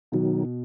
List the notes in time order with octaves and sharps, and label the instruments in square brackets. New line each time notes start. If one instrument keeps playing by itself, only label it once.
[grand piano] B2 [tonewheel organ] D#3 F#3